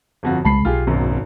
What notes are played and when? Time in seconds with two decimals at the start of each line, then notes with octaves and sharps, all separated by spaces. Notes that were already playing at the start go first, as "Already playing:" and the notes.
0.23 G1 F2 F#4
0.45 C2 C#3 G#3 A5 B5 C7
0.65 B1 F4 G4 G#4
0.87 G#1 F#2 B2